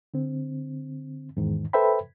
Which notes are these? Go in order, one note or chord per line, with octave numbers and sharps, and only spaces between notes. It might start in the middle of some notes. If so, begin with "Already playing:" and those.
D3 C4
E2 G#2 D#3
A4 B4 C5 E5 G5 B5